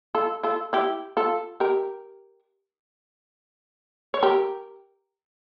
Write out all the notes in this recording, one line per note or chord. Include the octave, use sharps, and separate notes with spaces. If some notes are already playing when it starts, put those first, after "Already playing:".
F4 A4
F4 A4
E4 G4
F4 A4
G4 A#4
C#5
G4 A#4